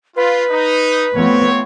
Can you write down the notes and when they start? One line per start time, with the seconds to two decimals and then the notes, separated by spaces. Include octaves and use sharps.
0.16 F4 B4
0.49 D#4
1.15 F3 A3 B3 C4 C#5